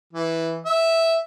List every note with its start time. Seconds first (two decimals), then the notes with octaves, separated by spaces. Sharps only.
0.13 E3
0.66 E5